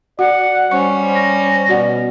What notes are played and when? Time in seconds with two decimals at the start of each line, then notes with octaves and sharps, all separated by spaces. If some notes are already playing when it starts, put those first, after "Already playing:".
0.19 F#4 D5 F#5
0.71 G3 C#4 C5 C#6
1.15 A#6
1.69 B2 F#4 D5 F#5